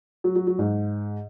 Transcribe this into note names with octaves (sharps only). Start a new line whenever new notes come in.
F#3
F#3
F#3
G#2